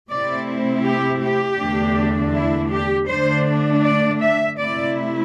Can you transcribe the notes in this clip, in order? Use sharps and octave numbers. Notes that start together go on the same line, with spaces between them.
C3 A3 C4 E4 D5
G4
G4
E2 D3 A3 D4
E4
G4
D3 A3 D4 C5
D5
E5
C3 A3 E4 D5